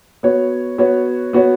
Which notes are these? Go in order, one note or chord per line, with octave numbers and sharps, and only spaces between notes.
B3 F#4 C#5
B3 F#4 C#5
B3 F#4 C#5